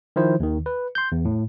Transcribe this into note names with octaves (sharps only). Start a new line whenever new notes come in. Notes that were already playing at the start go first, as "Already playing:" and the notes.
D#3 F3 E4 C5
D#2 D#3
B4
C6 G6
E2
A2